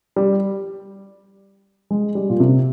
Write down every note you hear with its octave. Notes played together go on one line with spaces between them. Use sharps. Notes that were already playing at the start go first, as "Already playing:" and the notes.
G3
G#3
G3
A#2
C3